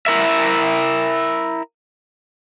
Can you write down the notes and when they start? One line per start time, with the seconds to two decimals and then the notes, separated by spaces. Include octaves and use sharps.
0.06 E4 A#4 E5